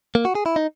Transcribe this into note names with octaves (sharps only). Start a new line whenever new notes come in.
A#3
F#4
G#4
E4
D#4